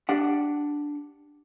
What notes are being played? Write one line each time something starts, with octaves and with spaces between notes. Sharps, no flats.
D4 G4 F#5